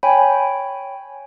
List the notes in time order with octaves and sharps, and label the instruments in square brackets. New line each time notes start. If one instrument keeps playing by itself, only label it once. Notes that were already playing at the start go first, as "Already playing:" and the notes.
[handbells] C#5 G5 G#5 B5